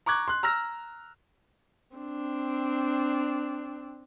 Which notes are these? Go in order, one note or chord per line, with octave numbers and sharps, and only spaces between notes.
A#5 C#6 D6 F#6 G#6
C6 F#6
A#5 E6 F6 A#6
C4 D4